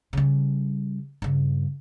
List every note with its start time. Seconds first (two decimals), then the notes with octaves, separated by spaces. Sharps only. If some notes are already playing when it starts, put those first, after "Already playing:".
0.13 C#3 G3
1.22 G2 C#3